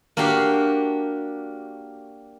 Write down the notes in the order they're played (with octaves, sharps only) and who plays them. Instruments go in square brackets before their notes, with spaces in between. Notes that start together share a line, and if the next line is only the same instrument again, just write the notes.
[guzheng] A#3 D4 F#4 G4 F5